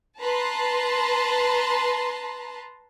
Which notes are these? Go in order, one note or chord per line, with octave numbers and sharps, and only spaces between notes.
B4 A5 A#5 C6